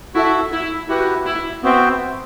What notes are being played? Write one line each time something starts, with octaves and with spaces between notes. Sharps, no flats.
E4 F#4 A4 E5
E4
E4 F#4 G4 B4
E4
B3 C4 F#4 C5 E5 G5